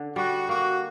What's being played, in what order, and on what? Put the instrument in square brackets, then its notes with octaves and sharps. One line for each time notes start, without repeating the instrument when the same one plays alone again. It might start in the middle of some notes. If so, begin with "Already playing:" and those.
Already playing: [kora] D3
[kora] G3 [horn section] F#4
[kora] A#3 [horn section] F#4